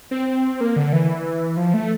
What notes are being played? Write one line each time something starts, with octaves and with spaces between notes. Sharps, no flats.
C4
A#3
D3
E3
F3
A3